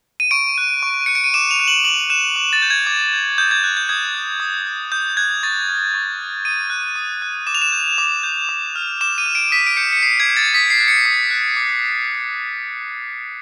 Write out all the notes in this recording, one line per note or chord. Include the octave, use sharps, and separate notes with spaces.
D#7
C#6 D7
F#6
C#6
F#6 C#7
D7
D#7
D6 E7
F7
F#6
F#7
D6 F#7
F#6 E7
D6
A6
G6
G#6
D6
G6
D#6 G6
G#6
F#6 G6
G6
D#6 G#6
F#6
D#6
F#6
D#6 G6
F#6 G#6
C#6 A6
F6
C#6
F6
D#6 D#7
F#6
D#6
F#6
D6 E7
F7
E7
G6
D6
G6
D6
F6
D6 E7
D#7
F6
D7
D#6 B6
D7
G6 C#7
C#7
D#6 C7
G#6
G6
A6
D#6 B6
C7
F#6
C#7
D#6 C#7
F#6
D6